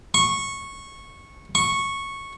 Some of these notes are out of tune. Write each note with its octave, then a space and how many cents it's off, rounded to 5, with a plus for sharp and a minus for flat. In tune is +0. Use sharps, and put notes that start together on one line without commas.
C#6 -15
C#6 -10